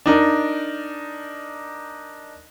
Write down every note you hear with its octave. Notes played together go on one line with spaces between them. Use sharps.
D4 D#4 A#4